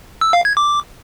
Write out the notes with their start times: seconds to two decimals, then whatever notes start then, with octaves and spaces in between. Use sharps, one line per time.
0.21 E6
0.33 F5
0.45 G#6
0.57 D6